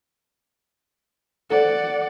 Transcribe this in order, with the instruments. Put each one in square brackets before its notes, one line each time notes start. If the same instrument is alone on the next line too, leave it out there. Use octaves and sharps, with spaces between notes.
[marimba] A4 C5 [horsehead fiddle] D5 F#5